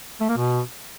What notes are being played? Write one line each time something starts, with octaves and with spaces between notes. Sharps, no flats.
A3
A#3
B2